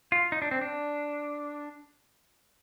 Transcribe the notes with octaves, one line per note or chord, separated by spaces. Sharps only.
F4
D#4
D4
C4
D4